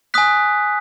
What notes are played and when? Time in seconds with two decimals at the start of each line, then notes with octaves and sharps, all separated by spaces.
0.14 G#5 D#6 F#6 B6